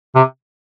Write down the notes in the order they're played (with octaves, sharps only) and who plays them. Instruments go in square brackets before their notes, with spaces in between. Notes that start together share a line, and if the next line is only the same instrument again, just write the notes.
[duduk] C3